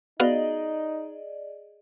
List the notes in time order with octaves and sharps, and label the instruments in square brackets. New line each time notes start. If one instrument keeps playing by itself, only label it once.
[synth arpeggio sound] B3 F#4 F5 [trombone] D#4 [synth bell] G#4 D5 D#5